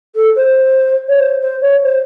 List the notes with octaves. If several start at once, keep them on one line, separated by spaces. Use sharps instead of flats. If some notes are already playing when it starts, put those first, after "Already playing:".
A4
C5
C#5
C5
C5
C#5
C5